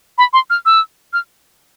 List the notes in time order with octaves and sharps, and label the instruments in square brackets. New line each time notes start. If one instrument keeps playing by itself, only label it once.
[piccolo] B5
C6
F6
E6
F6